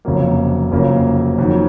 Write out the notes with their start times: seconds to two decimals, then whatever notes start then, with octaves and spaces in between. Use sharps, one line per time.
0.05 F1 F2 C#3 F#3 A#3
0.71 F1 F2 C#3 F#3 A#3
1.38 F2 D#3 F#3